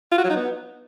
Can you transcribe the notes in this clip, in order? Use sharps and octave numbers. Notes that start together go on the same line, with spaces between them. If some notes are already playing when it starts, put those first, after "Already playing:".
F4
F#4
F#3
D#4
B3